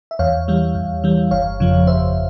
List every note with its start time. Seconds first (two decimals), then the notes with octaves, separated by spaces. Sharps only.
0.11 E5
0.19 E2 C#5 F5
0.48 E3 G3
0.75 E2
1.04 E3 G3
1.31 G1 C#5 F5
1.60 F2 C#3 F3
1.87 G1 C5 E5